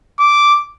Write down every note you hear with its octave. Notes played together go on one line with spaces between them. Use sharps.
D6